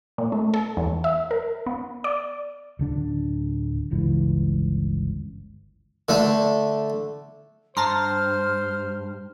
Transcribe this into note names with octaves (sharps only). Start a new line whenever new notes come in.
A#2
A3
A4
E2
E5
A#4
B3
D5
D1 D3 D4
G1 C#2 E3
D3 A3
G2 C5 A5 A#5 C6 F6